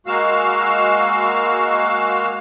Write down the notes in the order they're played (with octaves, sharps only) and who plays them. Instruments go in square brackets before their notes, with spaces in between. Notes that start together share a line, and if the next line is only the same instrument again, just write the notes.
[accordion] G#3 A#3 F#4 F5 E6